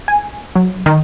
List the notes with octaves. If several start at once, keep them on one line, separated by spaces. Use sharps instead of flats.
G#5
F#3
D#3